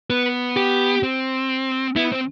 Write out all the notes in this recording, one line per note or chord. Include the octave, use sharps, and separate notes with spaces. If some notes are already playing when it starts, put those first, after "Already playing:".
B3 B4
G4
C4
B3 E4
C4